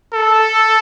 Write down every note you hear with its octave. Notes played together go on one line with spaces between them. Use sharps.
A4